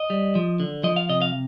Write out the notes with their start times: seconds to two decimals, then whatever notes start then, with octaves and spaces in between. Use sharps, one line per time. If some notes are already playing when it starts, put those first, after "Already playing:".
Already playing: D#5
0.10 G3
0.35 F3
0.60 D3
0.84 F3 D#5
0.96 F5
1.09 C3 D#5
1.22 F5